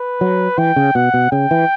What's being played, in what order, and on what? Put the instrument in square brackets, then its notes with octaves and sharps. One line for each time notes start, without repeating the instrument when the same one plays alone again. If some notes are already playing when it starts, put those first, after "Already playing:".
Already playing: [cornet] B4
[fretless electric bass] F#3
[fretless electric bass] E3 [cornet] G5
[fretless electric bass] C#3
[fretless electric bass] B2 [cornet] F#5
[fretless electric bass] B2
[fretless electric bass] C#3 [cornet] G5
[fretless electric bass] E3